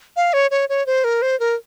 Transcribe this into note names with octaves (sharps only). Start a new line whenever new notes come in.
F5
C#5
C#5
C#5
C5
A#4
C5
A#4